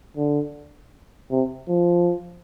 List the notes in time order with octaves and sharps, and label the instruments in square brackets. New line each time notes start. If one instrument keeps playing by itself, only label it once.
[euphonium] D3
C3
F3